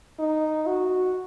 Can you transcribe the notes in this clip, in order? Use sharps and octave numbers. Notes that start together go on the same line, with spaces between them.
D#4
F#4